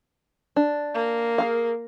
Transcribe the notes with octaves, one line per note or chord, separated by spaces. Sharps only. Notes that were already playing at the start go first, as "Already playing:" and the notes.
D4
A#3
G#4 A#4 F5